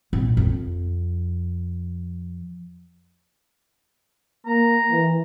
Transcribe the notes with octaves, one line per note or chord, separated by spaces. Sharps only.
A#1
F2
A#3 A#5
E3